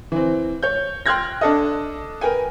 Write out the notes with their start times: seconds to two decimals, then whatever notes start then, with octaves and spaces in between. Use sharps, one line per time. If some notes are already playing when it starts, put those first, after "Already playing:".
0.12 E3 C4
0.63 C#5 G6
1.06 G5 C6 F6 F#6 G#6 A#6
1.41 D4 A4 D#5
2.21 A#4 B4 G5 G#5